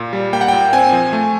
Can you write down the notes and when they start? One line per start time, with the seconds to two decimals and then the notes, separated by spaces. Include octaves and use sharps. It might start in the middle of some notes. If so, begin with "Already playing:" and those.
Already playing: A#2
0.13 G3
0.33 A#3 G5
0.41 F#5
0.48 A#2 G5
0.73 C4 G#5
0.92 F3
1.13 A3